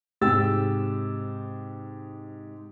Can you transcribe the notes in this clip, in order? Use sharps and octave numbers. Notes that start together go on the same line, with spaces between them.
G#2 C3 G4 G#4 E6 A6